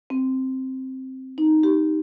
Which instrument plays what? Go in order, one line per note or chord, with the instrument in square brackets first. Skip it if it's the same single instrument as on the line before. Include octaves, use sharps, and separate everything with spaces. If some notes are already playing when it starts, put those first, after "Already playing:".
[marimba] C4
D#4
G4